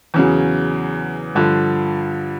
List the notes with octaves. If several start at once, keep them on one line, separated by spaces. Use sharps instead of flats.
E2 C#3 F#3
G2 D3 F3